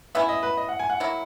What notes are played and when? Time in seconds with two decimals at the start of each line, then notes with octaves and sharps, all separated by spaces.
0.15 C#3 E3 B3 E4 E5
0.29 D#5
0.43 B4
0.57 D#5
0.69 F#5
0.79 G#5
0.90 F#5
1.00 F#3 A#3 E4